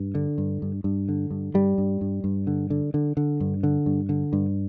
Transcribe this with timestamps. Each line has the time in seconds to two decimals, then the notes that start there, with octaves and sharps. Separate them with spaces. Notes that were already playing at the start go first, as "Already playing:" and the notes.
Already playing: G2
0.15 D3
0.38 G2
0.62 G2
0.84 G2
1.09 D3
1.31 G2
1.54 G2 G3
1.78 G2
2.01 G2
2.24 G2
2.47 D3
2.70 D3
2.94 D3
3.17 D3
3.40 G2
3.63 D3
3.86 G2
4.09 D3
4.33 G2